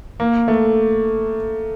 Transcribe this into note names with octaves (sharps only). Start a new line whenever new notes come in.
A#3
A3